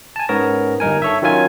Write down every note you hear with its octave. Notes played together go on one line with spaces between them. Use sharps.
G#5 A5
G#2 B3 C#4 A#4 C#5 A#6
G1 G2 D#4 A#4 G#5
A4 C#5 E5
D#3 F#3 C#4 F4 G#5 G#6